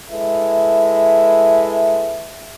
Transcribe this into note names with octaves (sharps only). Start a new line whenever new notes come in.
G#3 E4 A4 B4 E5